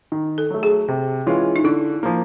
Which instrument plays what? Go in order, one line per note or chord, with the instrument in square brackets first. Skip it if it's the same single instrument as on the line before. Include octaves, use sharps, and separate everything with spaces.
[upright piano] D#3
[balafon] A4
[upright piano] F#3 A3
[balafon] G#4
[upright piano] C3
E3 G#3 C#4 F4
[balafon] D#4
[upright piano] D3 [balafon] E4
[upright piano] F3 A#3